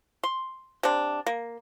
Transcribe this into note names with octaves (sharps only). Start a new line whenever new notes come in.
C6
C3 D4
A#3